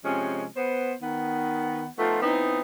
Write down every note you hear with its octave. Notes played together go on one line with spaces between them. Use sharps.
C3 F3 G#3 C#4
B3 C5
D#3 B3
F3 A3 B3 D#4 F4
E3 B3 C4 D#4